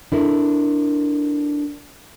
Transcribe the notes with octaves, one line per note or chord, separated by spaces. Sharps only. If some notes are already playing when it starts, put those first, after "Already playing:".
D4 E4 A4 A#4